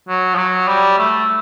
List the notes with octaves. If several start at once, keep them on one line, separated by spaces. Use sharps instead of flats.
F#3
F3
F#3
G3
A3